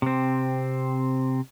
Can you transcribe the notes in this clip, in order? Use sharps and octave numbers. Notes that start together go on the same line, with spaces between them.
C3 C4